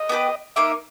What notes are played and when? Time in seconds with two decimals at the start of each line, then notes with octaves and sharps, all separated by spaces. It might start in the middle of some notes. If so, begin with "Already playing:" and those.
Already playing: D#5
0.09 B3 G4 B4
0.56 A#3 D#4 A#4 E5